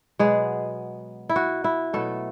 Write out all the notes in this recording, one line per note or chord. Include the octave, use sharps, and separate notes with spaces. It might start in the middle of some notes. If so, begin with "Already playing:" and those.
B2 F#3 G#3 B3 G#4
E4
F#4
E4
B2 F#3 A3 B3 A4